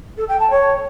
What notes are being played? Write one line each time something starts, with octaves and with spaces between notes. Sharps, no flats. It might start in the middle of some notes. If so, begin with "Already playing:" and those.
A4
G5
A5
C#5